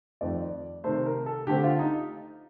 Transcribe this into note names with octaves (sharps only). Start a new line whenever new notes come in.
F2 D#3 A3 C4 D5
C3 D#3 A3 C5
A#4
A4
D3 A3 C4 G4
F4
D#4